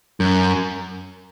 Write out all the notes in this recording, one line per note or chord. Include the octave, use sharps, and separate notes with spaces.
F#2